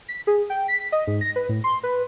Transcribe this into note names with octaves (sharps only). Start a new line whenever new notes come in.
B6
G#4
G5
B6
D#5
G#2
A#6
B4
A2
C6
B4